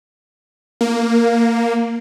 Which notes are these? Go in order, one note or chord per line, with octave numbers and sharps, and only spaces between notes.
A#3